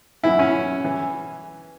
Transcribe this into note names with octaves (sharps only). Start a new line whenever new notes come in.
F#2 E3 E4
C#4
E3